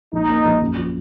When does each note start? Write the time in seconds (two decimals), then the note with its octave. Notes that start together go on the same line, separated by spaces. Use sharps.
0.13 A#1 D#4
0.29 A#3
0.45 A#1
0.61 F#2
0.77 F3